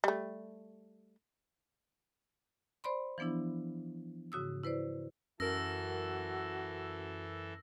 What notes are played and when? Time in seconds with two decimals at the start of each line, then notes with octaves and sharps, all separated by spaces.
0.04 G3 A3
2.84 C5 D5 B5 C6
3.18 E3 F3 B3 D4 E4
4.32 G#2 C#3 F#4 D#6 E6
4.63 E4 B4 C5 D5
5.40 F#2 E3 F#4 A4 A#4 E6 A#6